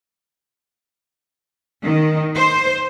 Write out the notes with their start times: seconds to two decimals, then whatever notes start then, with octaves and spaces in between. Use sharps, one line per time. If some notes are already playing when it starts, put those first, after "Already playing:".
1.83 D#3
2.34 C5